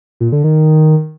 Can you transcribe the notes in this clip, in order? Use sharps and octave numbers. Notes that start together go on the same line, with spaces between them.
A#2
D3
D#3